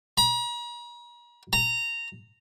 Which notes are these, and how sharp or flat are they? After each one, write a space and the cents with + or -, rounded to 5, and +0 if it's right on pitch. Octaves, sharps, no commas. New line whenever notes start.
A#5 +45
A#5 -15